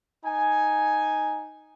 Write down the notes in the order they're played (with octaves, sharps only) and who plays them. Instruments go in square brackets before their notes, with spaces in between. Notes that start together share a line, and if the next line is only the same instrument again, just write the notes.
[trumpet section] D#4 G#5